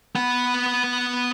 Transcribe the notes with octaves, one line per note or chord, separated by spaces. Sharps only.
B3 F#5